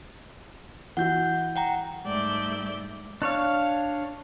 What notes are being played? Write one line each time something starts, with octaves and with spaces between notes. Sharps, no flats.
E3 F#4 F#5 G6
F#5 G5 A#5
G#2 G3 A3 D5 E5 G6
D4 C#5 F5